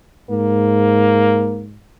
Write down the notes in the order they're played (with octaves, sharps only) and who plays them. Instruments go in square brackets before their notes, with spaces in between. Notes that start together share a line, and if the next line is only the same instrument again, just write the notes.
[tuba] G#2 [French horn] A#3